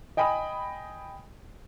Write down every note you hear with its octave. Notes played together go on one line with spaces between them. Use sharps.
D#5 G5 G#5 B5 D#6